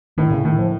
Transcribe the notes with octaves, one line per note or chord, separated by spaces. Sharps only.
A2 D#3
C#3
A2 D#3
F3